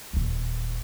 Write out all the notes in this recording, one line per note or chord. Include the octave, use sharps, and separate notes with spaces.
D#1 E2